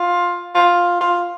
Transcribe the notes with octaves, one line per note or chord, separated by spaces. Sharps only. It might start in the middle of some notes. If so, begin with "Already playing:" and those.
Already playing: F4
F4
F4